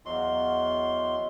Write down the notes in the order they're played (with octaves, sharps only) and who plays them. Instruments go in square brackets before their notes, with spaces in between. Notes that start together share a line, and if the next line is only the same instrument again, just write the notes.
[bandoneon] E2 C6 [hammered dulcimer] F#3 F5 [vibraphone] D#5